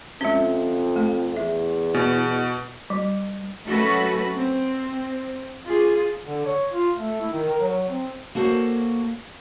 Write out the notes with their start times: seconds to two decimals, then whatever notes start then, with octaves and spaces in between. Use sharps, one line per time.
0.21 F2 G#3 C#4
0.96 A3
1.36 E2 E5
1.94 B2 B3
2.90 G3
3.66 F#3 A3 C#4 F#4 A4 B4
4.37 C4
5.66 F4 G#4
6.25 D3
6.45 C#5
6.72 F4
6.97 A3
7.20 E4
7.33 D#3
7.49 A#4
7.60 F#3
7.89 C4
8.35 A#3 F#4 A4 C5 C#5 F5